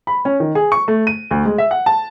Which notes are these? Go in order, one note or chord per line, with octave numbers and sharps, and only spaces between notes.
B5
C#4
D#3
G#4
C#6
A3
D#7
D2
G#3
E5
F#5
A5